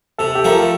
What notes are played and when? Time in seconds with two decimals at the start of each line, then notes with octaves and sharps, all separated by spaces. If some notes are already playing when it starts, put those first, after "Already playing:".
0.18 C3 A4
0.35 G4
0.44 F3 A3 A#4
0.53 A4